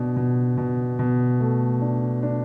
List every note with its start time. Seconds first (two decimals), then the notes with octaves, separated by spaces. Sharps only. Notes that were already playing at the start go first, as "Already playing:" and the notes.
Already playing: B2 D4
0.16 B2
0.57 B2
0.99 B2
1.40 A3
1.81 D4
2.23 D4